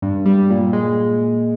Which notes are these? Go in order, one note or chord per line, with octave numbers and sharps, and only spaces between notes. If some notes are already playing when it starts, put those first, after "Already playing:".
G2
G3
A#2
G#3